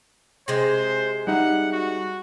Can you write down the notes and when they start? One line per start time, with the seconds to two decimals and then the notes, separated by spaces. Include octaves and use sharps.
0.48 C3 G#3 C5
1.27 G3 D#4 E5 F#5
1.72 F#4